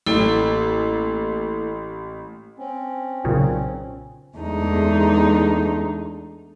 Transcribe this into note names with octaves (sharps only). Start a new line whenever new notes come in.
A1 A#3 E4 A4
C4 C#4
B1 A#2 C#3
E2 G#3 A3 D4 D#4